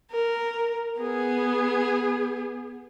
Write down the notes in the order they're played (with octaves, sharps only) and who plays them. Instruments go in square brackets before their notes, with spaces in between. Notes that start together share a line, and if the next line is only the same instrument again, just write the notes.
[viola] A#4
B3 G#4